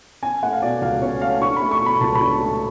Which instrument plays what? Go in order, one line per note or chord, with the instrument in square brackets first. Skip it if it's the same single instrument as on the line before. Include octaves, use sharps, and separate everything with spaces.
[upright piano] C#4 G#5
A3 F#5
F5
B2 D5
C#2 F5
C#4 C#5
A3 F5
D4 C#6
A3 B5
C#6
B2 B5
C#2 A5
B5
D4
A3